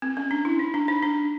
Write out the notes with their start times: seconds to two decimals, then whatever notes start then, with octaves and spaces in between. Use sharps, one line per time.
0.02 C4
0.17 C#4
0.31 D4
0.45 E4
0.59 D#4
0.74 D4
0.88 D#4
1.03 D4